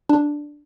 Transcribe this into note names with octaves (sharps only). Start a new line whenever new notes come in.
D4